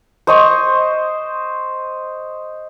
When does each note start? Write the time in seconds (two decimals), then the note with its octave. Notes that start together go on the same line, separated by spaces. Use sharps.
0.27 C5 D#5 C#6